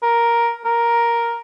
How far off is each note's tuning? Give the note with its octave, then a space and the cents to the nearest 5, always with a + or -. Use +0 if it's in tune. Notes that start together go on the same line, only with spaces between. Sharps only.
A#4 +5
A#4 +5